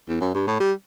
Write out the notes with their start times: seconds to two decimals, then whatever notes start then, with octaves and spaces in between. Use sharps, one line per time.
0.09 E2
0.21 F#2
0.35 G2
0.47 A2
0.60 G3